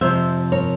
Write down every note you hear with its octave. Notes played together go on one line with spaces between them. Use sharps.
F2 C3 F3 C5 E5
A#4 C#5